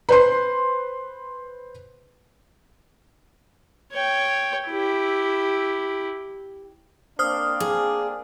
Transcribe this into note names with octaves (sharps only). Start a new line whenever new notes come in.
B4 C5 C6
C#5 G5
E4 G4
A#3 C4 D4 C5 D#6 F6
G#4